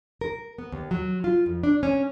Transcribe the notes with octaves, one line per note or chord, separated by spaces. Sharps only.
A#4
B3
D#2
F#3
F4
F2
D4
C#4